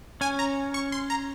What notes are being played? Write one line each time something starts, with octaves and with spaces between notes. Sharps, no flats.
C#4 G#5
A#5
C#6
C6
A#5